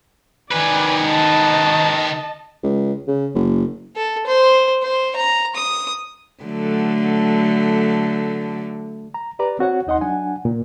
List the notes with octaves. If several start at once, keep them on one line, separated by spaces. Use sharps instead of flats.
D#3 B4 D5 G#5
D#5 A5
C#2
C#3
F#1
A4
C5
C5
A#5
D#6
D3 F#3 A3
A#5
G4 B4 D5 A#5
C4 F#4 C#5 F#5
D#2 D#4 D#5 F#5 C6
F#3 D4 F#5 G#5
A#2